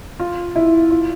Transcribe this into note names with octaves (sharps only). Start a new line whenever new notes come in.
F4
E4
F4